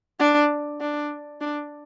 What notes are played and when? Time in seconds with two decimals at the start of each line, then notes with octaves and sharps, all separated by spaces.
0.20 D4
0.81 D4
1.41 D4